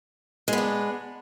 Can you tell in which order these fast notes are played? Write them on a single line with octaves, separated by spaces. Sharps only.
G#3 B3 D4